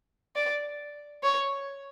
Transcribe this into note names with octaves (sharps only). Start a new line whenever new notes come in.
D5
C#5